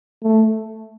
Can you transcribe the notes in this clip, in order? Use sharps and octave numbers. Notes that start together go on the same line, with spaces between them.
A3